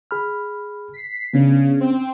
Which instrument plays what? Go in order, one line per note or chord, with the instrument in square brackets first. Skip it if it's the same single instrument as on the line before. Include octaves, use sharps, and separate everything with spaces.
[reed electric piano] G#4 B5 F6
[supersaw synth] B6 C7
[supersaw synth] C#3 [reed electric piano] B3 C#4 D4
[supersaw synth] C4